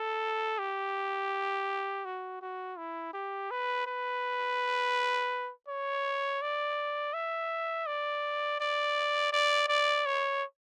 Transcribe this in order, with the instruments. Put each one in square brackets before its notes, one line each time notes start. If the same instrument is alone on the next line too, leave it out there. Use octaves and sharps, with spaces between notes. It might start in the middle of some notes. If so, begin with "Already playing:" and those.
Already playing: [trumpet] A4
G4
F#4
F#4
E4
G4
B4
B4
C#5
D5
E5
D5
D5
D5
D5
C#5